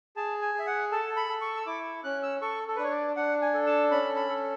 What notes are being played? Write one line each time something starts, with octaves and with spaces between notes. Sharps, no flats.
G#4 A5
G#5
G#4 E5
F#5
A4 A5
B5
A4
C#6
E6
E4 D6
C#4 F#6
E6
A4 C#6
A4
B4
D4 C#5
D5
D4 F#5
G#5
A4
A5
C#4 B5
B5
A4